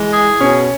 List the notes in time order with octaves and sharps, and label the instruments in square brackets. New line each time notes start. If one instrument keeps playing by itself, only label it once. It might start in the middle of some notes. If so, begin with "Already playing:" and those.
Already playing: [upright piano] E3 [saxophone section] G#3
[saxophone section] G#4
[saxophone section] B2 [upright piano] C#4